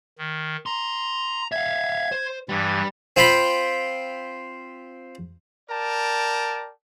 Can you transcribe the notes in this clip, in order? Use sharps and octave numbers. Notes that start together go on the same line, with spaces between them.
D#3
A#5 C6
E5 F5 G#6
C5
G2 E3 G3
C4 F4 G5 B5
A#4 D5 G5 A5